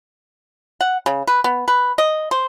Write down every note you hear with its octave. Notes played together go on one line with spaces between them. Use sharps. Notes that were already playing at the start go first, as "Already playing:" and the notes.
F#5
C#3
B4
B3
B4
D#5
C5